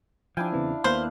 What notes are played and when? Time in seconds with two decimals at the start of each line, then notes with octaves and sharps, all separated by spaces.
0.37 F3 D4 E4 F5 G5 G#5
0.52 E2 C#3 E3 C4
0.84 D#2 A#3 B3 B4 C5 F5 F#6